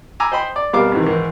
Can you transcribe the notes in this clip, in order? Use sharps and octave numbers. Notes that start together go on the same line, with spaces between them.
G#5 A#5 B5 D6 E6
C5 D#5 G5 B5 C6
D5
B2 G3 C4 A#4 F5 D6
G#2 C3 D#3 E3
G#2 D#3 E3